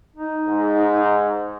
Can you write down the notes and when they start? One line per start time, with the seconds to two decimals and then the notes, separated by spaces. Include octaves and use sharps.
0.16 D#4
0.47 G#2